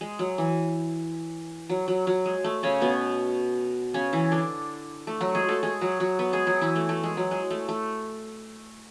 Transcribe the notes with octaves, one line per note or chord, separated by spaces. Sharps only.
G#3
F#3
E3
F#3
F#3
F#3
G#3
A3
C#3 C#4
B2 B3
C#3 C#4
E3 E4
D3 D4
A3
F#3 F#4
G#3 G#4
A3 A4
G#3 G#4
F#3 F#4
F#3 F#4
B3 B4
G#3 G#4
F#3 F#4
E3 E4
A3
A3
G#3
F#3
G#3
A3
A3